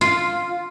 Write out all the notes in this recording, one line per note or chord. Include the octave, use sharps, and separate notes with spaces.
F4